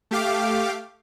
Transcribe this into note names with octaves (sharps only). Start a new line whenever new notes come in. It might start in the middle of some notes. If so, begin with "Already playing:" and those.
A3 G4 F5 D6